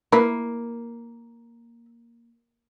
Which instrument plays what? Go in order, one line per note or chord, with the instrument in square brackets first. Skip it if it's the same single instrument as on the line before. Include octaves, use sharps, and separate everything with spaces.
[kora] A#3 [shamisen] E4 A#4 B4